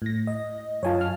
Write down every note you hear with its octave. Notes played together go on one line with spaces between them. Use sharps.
A2 A#6
D#5
F#2 F4 C#5 G#5 A5
F5 F6